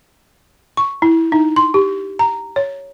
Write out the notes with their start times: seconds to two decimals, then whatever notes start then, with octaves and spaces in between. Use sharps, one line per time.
0.77 C#6
1.02 E4
1.32 D#4
1.56 C6
1.74 G4
2.19 A#5
2.56 C#5